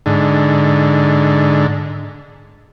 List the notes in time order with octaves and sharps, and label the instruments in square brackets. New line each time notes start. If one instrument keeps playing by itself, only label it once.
[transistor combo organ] G#2 D3